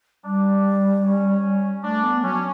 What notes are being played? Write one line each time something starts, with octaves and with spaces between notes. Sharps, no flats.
G3 D4
C#4
A3 D4
B3
F#3 C#4